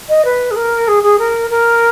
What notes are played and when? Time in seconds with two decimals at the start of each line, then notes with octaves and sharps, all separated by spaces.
0.09 D#5
0.25 B4
0.51 G#4
0.56 A#4
0.88 G#4
1.03 G#4
1.19 A#4
1.51 A#4